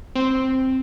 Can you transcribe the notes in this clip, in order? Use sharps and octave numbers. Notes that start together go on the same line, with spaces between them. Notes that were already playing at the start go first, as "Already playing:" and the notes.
C4